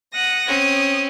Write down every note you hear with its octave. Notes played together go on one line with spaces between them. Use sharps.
F#5 D#6 A#6
C4 C#4 D#6